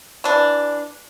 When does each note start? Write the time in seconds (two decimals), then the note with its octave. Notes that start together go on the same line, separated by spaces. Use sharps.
0.24 E3 D4